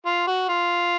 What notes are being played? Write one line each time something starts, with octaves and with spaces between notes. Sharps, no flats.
F4
F#4
F4